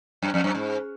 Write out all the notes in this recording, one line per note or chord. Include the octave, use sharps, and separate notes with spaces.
F#2
F2
F#2
G#2